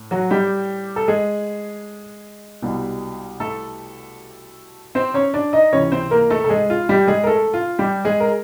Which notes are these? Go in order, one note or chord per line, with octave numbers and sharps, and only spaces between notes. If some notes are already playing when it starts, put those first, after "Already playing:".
Already playing: A2
F#3 F#4
G3 G4
A4
G#3 G#4
C2 B2 G3
A3 A4
C4 C5
C#4 C#5
D4 D5
D#4 D#5
C#2 C3 E3 C#4 C#5
C4 C5
A#3 A#4
A3 A4
A4
G#3 G#4
F4
G3 G4
G#3 G#4
A#4
A3 A4
F4
G3 G4
G#3 G#4
A#4